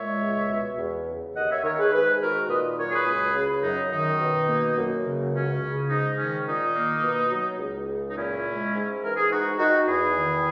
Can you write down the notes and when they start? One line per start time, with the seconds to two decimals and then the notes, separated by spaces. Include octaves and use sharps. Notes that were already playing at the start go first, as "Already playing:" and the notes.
Already playing: A#2 G#3 C#5 E5
0.22 C#2
0.50 B2
0.79 E2
1.08 C#3
1.35 D#2 D#5 F#5
1.51 C#5 E5
1.64 D#3 A#4 C#5
1.78 G#4 B4
1.93 G#2 G#4 B4
2.21 D#3 F#4 A#4
2.49 A#2 B4 D#5
2.77 F#3 A#4 C#5
2.91 G#4 B4
3.07 C#2
3.35 C#3
3.62 F#2 D#4
3.91 D#3 D#4
4.19 B2
4.48 A#3
4.77 F#2
5.04 C#3
5.33 C#2 C#4
5.61 C#3
5.89 G#2 D#4
6.17 D#3 C#4
6.46 A#2 D#4
6.75 A#3
7.03 B2
7.31 F#3
7.59 C#2
7.88 C#3
8.10 D#4
8.16 A#2 C#4 E4
8.45 G#3
8.73 G#2
9.02 E3 A#4
9.17 G#4
9.29 G#2 D#4 F#4
9.58 D#3 D#4 F#4
9.86 E2 E4 G#4
10.15 D#3